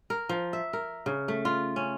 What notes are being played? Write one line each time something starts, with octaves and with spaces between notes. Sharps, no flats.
A#4
F3
E5
A#4
C#3
A3
F4
C#4